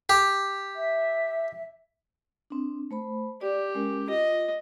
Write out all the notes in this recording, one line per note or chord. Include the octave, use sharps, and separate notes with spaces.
G4
E5
C4 D4
A3 C5 B5
G4 D5
G#3 C#4 A#4
F4 D#5